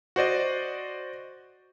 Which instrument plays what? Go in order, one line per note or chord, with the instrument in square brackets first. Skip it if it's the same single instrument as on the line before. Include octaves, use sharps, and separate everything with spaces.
[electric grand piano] F#4 C5 D5 D#5